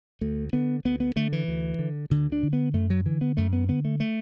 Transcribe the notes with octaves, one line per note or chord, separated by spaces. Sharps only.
D2 A3
D3 B3
D2 B3
B3
D3 A3
E3
D2
D3
D2 D3
D4
D3
B3
F#2 A3
F#3
D3 E3
B3
F#2 A3
B3
D3 B3
A3
A3